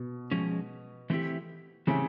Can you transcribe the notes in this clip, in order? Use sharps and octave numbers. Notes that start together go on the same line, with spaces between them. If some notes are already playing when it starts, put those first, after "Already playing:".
Already playing: B2
F3 G#3 C#4
E3 A3 C4 E4 G4
C#3 E3 A3 C4 E4 G4